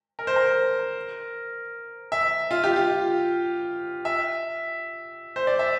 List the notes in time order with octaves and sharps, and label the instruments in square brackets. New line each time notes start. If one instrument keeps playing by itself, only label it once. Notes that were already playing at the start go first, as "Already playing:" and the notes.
[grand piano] A#4
C5
A#4
E5
F4
G4
F4
E5
C5
D5
E5